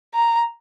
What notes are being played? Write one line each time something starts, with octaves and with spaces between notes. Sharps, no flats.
A#5